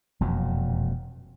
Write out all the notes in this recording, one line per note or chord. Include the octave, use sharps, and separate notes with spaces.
E1 F2 A#2 F#3